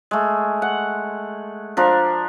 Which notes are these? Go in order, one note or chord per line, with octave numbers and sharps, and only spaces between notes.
G#3 A3
F#5
F3 D4 A#4